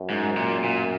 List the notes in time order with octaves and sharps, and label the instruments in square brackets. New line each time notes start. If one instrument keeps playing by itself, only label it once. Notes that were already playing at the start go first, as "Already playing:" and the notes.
Already playing: [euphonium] F#2
[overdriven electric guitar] G#2
A#2
A#2